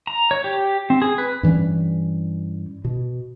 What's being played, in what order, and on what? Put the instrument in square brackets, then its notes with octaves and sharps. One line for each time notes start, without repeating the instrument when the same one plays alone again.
[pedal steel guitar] A#5
C#5
G4
C4
G#4
B4
[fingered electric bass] G2 E3 G3 C#4
B2